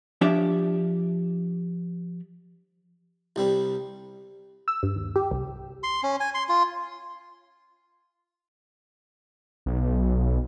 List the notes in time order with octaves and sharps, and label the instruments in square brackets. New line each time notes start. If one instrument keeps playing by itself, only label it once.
[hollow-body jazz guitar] F3 D4 G4 C#5 D5 E5
[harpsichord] C2 G3 C4
[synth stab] E6
G2
D#2
G4
C2
[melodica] C6
C#4
G#5
C6
F4
[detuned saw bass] B1